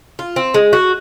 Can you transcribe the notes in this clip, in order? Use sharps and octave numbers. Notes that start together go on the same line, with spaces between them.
F4
C4
G#3
F#4